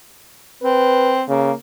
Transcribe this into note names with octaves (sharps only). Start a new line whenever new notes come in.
C4 B4
C#3 A#3